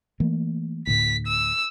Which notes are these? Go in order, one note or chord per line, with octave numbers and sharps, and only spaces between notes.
E3 A3 A#3
D2 A2 B6
E6